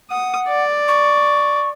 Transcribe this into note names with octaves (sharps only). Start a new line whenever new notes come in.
F#5 D#6
D5
C#6